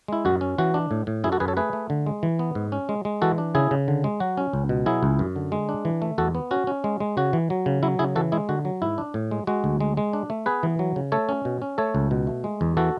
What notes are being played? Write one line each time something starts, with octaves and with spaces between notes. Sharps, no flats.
G#3 E4
F#2 F#4
C#4
E3 F#4
D4
A2
A2
F#2 E4 G#4
F#4 A4
F#2 G#4 B4
A4 C#5
A3 G#4 B4
A3
D3
G#3
E3
B3
G#2
C#4
G#3
G#3
E3 F#4 A4
D4
C#3 E4 G#4
C#3
D3
G#3
F#3 F#4
C#4
C#2
B2
F#3 E4 G#4
C#2
F#2
D3
G#3
D4
E3
A3
E2 F#4 A4
B3
C#4 F#4
C#4
G#3
G#3
C#3 F#4
E3
F#3
C#3
F#3 E4
C#3 E4 G#4
E3 F#4 A4
G#3 E4 G#4
D3 F#4
F#3
G#2 E4
D4
A2
G#3
G#3 F#4
D2
G#3
G#3
D4
A3
B3 G#4 B4
E3
F#3
C#3
A3 A4 C#5
C#4
B2
C#4
A3 A4 C#5
C#2
B2
A3
G#3
E2
E3 F#4 A4